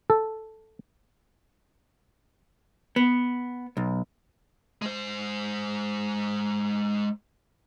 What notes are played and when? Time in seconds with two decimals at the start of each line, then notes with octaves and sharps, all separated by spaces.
0.10 A4
2.96 B3
3.77 B1
4.82 G#3 C5